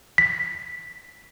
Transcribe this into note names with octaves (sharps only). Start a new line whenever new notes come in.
B6